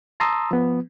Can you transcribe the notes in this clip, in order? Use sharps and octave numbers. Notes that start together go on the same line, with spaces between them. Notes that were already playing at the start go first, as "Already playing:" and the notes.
A5 A#5 C6 D#6 E6
F3 B3